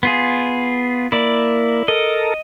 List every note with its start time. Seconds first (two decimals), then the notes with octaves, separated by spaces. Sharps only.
0.03 B3 F4 G#4
1.12 A#3 E4 D5
1.88 A4 A#4 D#5